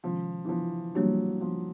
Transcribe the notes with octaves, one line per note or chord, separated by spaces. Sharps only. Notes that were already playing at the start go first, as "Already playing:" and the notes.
C3 D#3 F3 G#3 C#4
E3
F3
E3 F#3 G3 A#3 D4 G4
F3